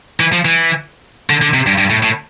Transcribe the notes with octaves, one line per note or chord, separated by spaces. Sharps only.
E3
F3
E3
D3
D3
C3
G2
G2
A2
A2